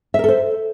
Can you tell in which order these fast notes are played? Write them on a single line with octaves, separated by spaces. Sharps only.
E5 A#4 A4 C5